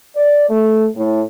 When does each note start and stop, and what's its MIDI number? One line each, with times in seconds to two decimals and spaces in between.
0.16 0.46 74
0.49 0.88 57
0.96 1.22 45